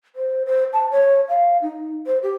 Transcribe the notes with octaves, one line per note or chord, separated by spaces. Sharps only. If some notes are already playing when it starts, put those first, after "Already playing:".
C5
C5
A5
C#5
F5
D#4
C5
G4